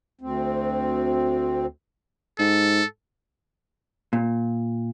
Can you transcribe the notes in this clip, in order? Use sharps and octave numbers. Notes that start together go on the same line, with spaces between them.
D2 C4
G#2 A4
A#2